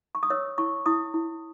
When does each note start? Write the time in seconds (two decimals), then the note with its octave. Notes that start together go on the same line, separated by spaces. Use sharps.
0.15 C#6
0.23 D#6
0.30 C#5 E6
0.58 E4 C#6
0.86 E4 D#6
1.14 E4